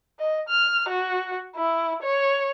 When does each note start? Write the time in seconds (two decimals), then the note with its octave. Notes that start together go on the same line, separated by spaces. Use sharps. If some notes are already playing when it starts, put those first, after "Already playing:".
0.19 D#5
0.49 F6
0.89 F#4
1.56 E4
2.02 C#5